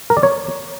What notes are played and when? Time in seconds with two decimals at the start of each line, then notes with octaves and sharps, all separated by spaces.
0.10 A#4
0.17 D5
0.23 C#5